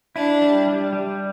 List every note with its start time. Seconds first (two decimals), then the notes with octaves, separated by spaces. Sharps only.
0.16 D4 E4
0.42 G3
0.67 G3
0.93 G3